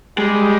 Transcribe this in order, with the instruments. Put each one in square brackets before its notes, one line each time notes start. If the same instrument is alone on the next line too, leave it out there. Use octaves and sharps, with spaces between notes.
[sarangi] G3 [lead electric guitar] G#3